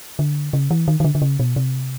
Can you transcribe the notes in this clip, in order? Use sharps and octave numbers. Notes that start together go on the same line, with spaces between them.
D3
C#3
E3
D#3
D#3
D3
D3
C#3
B2
C3